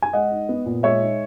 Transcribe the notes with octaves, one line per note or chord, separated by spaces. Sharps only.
G#5
G#3 D#5 F#5
D#4
B3
A#2
G#3 C#5 E5
D#4